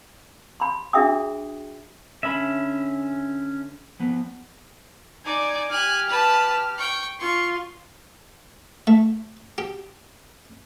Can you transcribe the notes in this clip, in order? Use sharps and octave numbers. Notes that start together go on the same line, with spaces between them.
B5 C6
D4 F#4 G#4 E5 G5 D#6
D3 C#4 E5 B5
F3 B3
D#4 D5 G#5 D6
G4 G#5 F6 F#6
B4 A5
G5 C#6
F4 C6 C#6
A3
G4